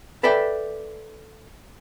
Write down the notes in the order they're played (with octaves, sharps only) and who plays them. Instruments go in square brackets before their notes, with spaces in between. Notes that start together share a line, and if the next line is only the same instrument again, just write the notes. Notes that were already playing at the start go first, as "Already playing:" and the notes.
[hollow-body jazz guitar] A4 B4 D5 E5 G5